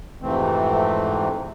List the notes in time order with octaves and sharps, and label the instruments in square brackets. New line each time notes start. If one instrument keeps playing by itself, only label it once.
[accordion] F2 G#2 C3 E3 A3 C4